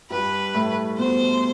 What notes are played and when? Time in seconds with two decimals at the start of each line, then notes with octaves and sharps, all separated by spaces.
0.10 G2 G3 B4
0.54 A2 A3
0.98 B2 B3 C5